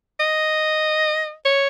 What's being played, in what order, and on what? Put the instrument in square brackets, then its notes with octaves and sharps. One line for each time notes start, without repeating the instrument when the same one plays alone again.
[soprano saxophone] D#5
C#5